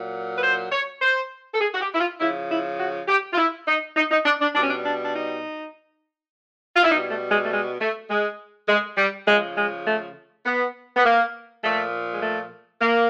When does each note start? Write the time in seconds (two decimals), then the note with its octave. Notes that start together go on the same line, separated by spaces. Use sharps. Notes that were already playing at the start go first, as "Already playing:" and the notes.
Already playing: A#2 F#3
0.37 B4
0.43 C5
0.72 C#5
1.02 C5
1.54 A4
1.61 G#4
1.74 F#4
1.81 G4
1.94 E4
2.00 F4
2.20 C#3 F3 E4
2.50 E4
2.78 F#4
3.08 G4
3.33 F4
3.37 E4
3.68 D#4
3.97 D#4
4.11 D#4
4.26 D4
4.41 D4
4.55 B2 G3 D4
4.64 C#4
4.70 D4
4.85 D4
5.05 D4
5.15 D#4
6.76 F4
6.84 E4
6.91 B2 G3 D#4
7.11 A3
7.31 G#3
7.45 A3
7.51 G#3
7.80 A3
8.10 G#3
8.68 G#3
8.97 G3
9.27 C#3 F3 G#3
9.57 G#3
9.86 A3
10.46 B3
10.97 B3
11.05 A#3
11.63 A#2 F3 A3
12.13 G#3
12.22 A3
12.81 A#3